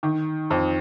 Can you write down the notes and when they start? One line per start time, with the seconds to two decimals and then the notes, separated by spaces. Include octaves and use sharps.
0.03 D#3
0.50 F2